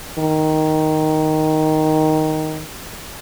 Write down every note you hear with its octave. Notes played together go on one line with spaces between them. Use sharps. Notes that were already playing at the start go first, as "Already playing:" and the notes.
D#3